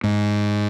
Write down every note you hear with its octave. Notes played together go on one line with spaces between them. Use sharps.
G#2